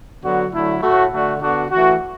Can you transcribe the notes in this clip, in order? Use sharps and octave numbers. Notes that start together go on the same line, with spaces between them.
D3 F#3 B3 F#4
D3 F#3 A3 E4
A2 A3 F#4
D3 A3 F#4
D3 B3 D4 F#4
E3 A3 F#4